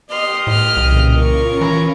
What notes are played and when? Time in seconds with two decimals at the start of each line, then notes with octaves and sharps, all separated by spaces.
0.11 G4 D#5 C6 F6
0.47 A2 F6
0.77 C2 A#2 C#3 E3
1.16 C#4 F4 A#4 C#6
1.61 E3 C#5 A#5 B5